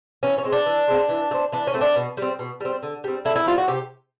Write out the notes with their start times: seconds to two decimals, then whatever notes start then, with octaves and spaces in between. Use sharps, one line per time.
0.23 E3 C#4
0.38 C#4
0.44 G#3 C4
0.52 D4
0.66 E3
0.88 G#3 C4
1.09 E3
1.31 A3
1.34 C4
1.52 E3 D4
1.67 C#4
1.74 A3 C4
1.81 D4
1.96 B2
2.17 G3 C4
2.39 B2
2.60 G3 C4
2.82 D3
3.04 G3 C4
3.25 D3 E4
3.36 E4
3.46 G3 C4 F4
3.58 F#4
3.68 C3 G4